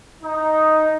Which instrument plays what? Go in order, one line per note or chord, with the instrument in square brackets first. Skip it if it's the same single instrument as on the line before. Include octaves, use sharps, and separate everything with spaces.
[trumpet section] D#4